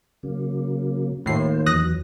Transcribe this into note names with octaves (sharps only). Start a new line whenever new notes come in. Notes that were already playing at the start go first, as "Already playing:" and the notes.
C#3 F#3 A#3
D#2 A2 F4 C5 C7
E2 E3 F#3 D#6 F#6 A#6